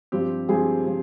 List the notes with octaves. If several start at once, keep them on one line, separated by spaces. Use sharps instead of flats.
G2 F3 C4 G4
G2 F3 C4 G#4
F3 C4